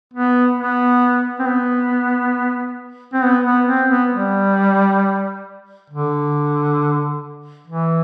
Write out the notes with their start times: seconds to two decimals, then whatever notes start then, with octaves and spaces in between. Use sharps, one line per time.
0.14 B3
0.57 B3
1.39 C4
1.46 B3
3.13 C4
3.23 B3
3.46 B3
3.68 C4
3.90 B3
4.12 G3
5.90 D3
7.67 E3